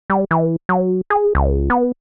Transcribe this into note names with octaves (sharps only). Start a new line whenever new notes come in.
G3
E3
F#3
G#4
C#2
B3